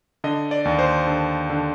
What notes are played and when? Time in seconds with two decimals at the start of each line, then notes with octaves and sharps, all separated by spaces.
0.24 D3 D#5
0.51 D5
0.65 D#2
0.79 C5
1.07 D3
1.50 D3